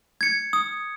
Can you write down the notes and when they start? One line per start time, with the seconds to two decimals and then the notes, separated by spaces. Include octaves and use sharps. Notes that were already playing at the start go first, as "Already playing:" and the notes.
0.21 G#6 C#7
0.53 D#6